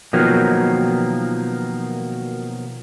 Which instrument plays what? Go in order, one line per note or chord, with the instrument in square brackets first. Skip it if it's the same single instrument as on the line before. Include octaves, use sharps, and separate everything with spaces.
[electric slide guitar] B2 D#3 F3 F#3 A#3